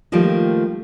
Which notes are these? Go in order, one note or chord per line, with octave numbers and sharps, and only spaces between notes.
D#3 F3 G3 A3 A#3 F4